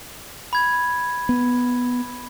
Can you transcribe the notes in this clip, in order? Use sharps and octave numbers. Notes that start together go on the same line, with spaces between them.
B5 G#6
B3